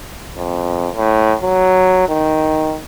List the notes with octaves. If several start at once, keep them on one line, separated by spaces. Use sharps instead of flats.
F2
A2
F#3
D#3